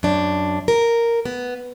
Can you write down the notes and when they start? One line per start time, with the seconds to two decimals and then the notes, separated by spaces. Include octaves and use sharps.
0.03 F#2 D4
0.68 A#4
1.25 B3